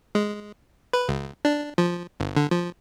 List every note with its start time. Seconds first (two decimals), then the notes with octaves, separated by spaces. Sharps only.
0.15 G#3
0.93 B4
1.09 C#2
1.45 D4
1.78 F3
2.20 G1
2.37 D3
2.51 F3